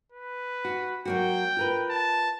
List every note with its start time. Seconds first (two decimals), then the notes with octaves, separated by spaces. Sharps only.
0.12 B4
0.65 F#4
1.05 F#3 A#3 F#4 G5
1.57 F4 A#4 B4
1.90 A5